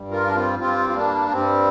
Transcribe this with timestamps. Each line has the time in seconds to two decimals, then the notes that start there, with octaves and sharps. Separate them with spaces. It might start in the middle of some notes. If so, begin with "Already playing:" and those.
Already playing: G2 G3
0.11 F4 A#4
0.27 D4
0.35 C4 F4
0.59 G2 G3 C4 F4
0.89 F4
0.95 A#3 D4
1.31 G2 G3 C4